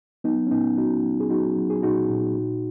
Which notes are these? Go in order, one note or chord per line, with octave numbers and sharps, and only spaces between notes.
F#3 B3 D#4
C#4
A#2 B3 D#4
F#3 D#4 F#4
F#3
G#4
F#3 D#4 F#4
F#3
G#4
A#2 D#4 F#4
A#2
A#2